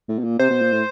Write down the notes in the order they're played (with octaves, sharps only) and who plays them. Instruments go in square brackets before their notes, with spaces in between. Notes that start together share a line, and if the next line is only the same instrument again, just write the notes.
[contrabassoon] A2
B2
A#2
[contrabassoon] C3 [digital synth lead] C5
[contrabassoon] B2
A#2
A2